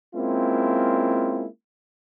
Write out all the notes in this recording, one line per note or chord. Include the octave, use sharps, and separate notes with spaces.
G#3 A#3 C4 C#4 E4 F4